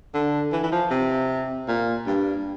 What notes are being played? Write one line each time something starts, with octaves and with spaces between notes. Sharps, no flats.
D3
E3
E3
F3
C3
A#2
G2